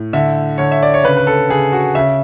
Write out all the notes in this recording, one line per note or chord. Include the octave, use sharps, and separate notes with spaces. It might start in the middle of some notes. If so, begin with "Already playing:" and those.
Already playing: A2
D3 E5
D3 C#5
E5
D5
C#5
C#3 B4
B4
A4
C#3 G#4
F#4
C#3 E5